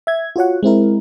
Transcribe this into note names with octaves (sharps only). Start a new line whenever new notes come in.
E5 G#6
F4 F#4 C#5 F#5
G#3 C4 E4 A#4